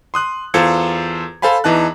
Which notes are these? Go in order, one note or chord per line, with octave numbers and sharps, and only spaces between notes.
C6 D#6 F#6
E2 F4 A4 C5 G#6 C#7
A4 C5 F5 G#5 B5
E2 E3 D#4 A5 F#6